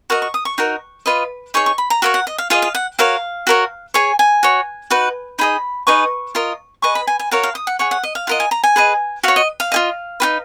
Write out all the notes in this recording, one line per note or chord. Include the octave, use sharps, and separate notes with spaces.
F#4 A#4 D#5 C#6
C#6
D#6
C#6
D#4 F#4 A#4
F4 B4 D#5
D#4 G#4 C#5 C#6
C#6
B5
A#5
F#4 A#4 C#5 F5
F#5
D#5
F5
F4 G#4 D#5 F5
F5
F#5
F#4 A#4 C#5 F5
F#4 A#4 C#5
G#4 C#5 G#5
G#5
F#4 C#5
D#4 F#4 B4
D#4 G#4 D#5 B5
D#4 G#4 B4 D#5 C#6
F4 A#4 D#5
G#4 B4 D#5 C#6
B5
G#5
G#5
F#4 A#4 C#5 F5
F5
D#6
F#5
G#4 C#5 F#5
F#5
D#5
F5
F4 A#4 D#5 F#5
G#5
A#5
G#5
G#4 B4 D#5
F#4 C#5 F5
D#5
F5
F4 G#4 D#5
D#4 F#4 B4